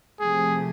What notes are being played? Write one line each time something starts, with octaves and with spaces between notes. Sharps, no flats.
C3 F3 A3 G#4